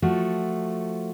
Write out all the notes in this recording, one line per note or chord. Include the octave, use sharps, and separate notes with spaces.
F3 A3 F#4